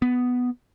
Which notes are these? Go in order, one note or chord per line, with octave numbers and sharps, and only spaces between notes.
B3